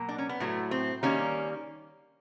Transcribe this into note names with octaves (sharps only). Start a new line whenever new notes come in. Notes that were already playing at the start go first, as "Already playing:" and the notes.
Already playing: B2 F#3 A#3
D4
C#4
B3
A2 F#3 A3
C4
D#3 G3 A#3 C#4